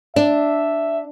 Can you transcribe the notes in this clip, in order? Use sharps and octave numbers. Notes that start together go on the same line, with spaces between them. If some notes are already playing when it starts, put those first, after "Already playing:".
D4 E5